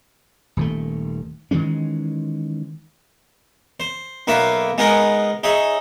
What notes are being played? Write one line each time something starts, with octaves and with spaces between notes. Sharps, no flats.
D#1 D#3 A3
D#3 E3 G#3 C#4
C5
B1 A#3 B4 E5 C#6
G#3 B3 D#4 G#4 A#4 F#5
D#4 G#4 C#5 E5